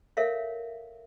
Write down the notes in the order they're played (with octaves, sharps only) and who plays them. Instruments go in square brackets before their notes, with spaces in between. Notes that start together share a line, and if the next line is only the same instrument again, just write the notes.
[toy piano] A4 A#4 C#5 E5 F5